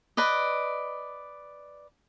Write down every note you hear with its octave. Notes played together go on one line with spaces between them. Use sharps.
B4 D5 D#5